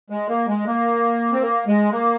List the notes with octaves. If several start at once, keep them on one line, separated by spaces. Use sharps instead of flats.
G#3
A#3
G#3
A#3
C4
A#3
G#3
A#3